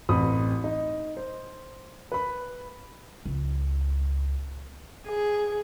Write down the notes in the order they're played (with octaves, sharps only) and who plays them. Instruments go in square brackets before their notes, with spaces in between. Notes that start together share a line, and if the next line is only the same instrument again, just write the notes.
[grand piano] A1 C4 B5 D#6
D#4
C5
B4 B5
[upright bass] C#2
[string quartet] G#4